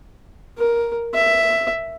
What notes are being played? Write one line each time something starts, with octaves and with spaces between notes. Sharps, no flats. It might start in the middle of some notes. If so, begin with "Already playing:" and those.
A#4
E5